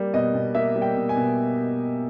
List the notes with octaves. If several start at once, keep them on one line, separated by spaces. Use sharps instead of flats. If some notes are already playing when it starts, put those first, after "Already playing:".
Already playing: G3 A#3
B2 D#5
B2
A#3 E5
G3
G5
B2
G#5
B2